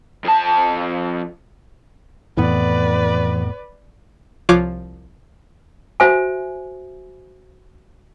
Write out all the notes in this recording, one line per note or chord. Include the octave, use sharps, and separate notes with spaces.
F2 A5
F2 A2 E3 B3 B4 D5
C2 F3 F4 C#5 D6 F#6
F#4 C5 E5 G#5